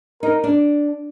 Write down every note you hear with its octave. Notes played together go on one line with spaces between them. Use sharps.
D#4 A#4
D4